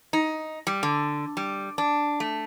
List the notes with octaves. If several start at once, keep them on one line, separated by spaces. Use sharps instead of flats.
D#4
G3
D3
G3
D4
A3